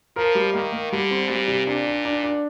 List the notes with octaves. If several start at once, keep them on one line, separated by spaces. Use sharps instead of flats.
F3 A#4
G3
D#3 A#3
A#3
D3 G3
C4
A#2 G3
C3
A#2 D4
D4
D4
D4